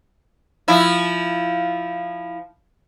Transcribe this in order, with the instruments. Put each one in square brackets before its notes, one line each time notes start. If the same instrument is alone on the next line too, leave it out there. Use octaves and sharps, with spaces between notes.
[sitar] F3 E4